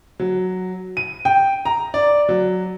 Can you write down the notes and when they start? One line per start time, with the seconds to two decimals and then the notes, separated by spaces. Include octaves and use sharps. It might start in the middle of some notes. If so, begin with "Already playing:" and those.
0.20 F#3
0.97 D#7
1.25 G5
1.65 A#5
1.94 D5
2.29 F#3